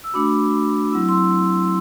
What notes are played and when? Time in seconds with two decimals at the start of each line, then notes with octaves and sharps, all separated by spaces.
0.04 E6
0.14 A3 D4 F#4 B5 D6
0.92 F#3 C4 E4 E6
1.09 C6 E6